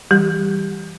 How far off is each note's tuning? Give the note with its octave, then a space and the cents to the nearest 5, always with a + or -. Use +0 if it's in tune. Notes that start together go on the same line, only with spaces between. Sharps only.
E3 +0 G3 +5 G4 +0